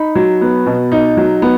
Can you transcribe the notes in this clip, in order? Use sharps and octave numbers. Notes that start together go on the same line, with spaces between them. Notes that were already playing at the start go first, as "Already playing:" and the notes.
Already playing: D#4 B5
F#3
B3
B2
D#4
F#3
B3